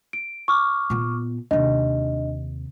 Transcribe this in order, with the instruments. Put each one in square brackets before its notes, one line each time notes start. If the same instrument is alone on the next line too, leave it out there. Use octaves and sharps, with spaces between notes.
[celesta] D7
C#6 D6 F6
[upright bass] A#2 B3
[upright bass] D#2 C3 [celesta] D4 D#5